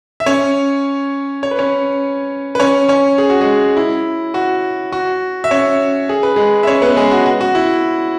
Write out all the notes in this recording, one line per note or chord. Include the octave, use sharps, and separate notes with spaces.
E5
C#4 C#5
C#5
B4
C#4 C#5
B4
C#4 C#5
C#4 C#5
G#4
F#4
G#3 G#4
E4
F#4
F#4
E5
C#4 C#5
G#4
B4
G#3 G#4
E5
C#4 C#5
B3 B4
G#3 G#4
F#4
F#4
F#4
E4